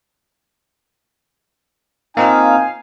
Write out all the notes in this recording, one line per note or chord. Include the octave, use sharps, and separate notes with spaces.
A#3 C4 D#4 F4 F5 G#5